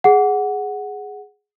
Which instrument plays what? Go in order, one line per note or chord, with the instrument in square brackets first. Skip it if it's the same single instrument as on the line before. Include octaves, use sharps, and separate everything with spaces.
[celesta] G#4 F#5